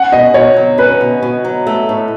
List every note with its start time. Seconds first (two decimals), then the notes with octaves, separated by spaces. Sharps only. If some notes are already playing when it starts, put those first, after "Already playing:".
Already playing: C#4 F#5
0.12 B2 D#5
0.34 B2 C#5
0.56 F#3
0.78 C#4 B4
1.01 B2
1.22 B2
1.45 F#3
1.67 A3
1.89 A2